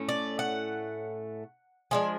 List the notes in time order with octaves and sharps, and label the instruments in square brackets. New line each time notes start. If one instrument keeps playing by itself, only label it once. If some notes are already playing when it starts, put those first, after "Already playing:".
Already playing: [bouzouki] A2 A3 C#4
D5
F#5
F3 G#3 D4 G#5